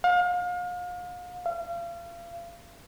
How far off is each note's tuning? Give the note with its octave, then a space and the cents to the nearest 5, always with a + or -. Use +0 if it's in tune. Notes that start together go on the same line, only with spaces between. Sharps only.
F5 +35
F5 -35